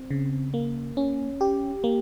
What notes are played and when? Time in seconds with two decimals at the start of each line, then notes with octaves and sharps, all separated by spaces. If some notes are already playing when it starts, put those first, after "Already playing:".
Already playing: C4
0.10 C#3
0.54 A#3
0.97 C#4
1.41 G4
1.84 A#3